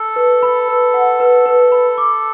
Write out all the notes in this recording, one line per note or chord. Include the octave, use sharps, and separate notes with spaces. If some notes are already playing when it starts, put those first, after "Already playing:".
Already playing: A4
B4
B5
B4
F#5
B4
B4
B5
D6